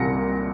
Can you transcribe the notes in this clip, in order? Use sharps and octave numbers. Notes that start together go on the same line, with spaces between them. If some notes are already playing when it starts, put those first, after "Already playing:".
Already playing: C2 A#2 G3 A#6 C#7